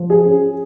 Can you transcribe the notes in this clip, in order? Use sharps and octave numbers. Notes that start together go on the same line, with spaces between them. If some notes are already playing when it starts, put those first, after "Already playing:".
Already playing: F3
G#4
C#4